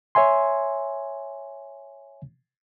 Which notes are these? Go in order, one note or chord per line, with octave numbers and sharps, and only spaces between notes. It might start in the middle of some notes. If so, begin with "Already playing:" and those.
C#5 E5 G#5 C6